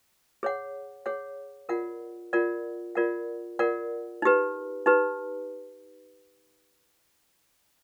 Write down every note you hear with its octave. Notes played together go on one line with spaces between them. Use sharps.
G#4 C#5 F#5
G#4 C#5 F#5
F4 A#4 D5 F#5
F4 A#4 D5 F#5
F4 A#4 D5 F#5
F4 A#4 D5 F#5
D#4 G4 B4
D#4 G4 B4